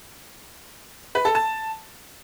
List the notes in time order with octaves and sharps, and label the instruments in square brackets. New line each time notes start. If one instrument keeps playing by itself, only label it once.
[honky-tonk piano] B4
A4
A5